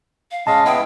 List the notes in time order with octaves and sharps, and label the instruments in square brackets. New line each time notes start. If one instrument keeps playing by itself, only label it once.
[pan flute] F5
[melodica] G#3 C#4 D#5 [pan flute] F5 [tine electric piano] A5
[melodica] B3 E4 [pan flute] G5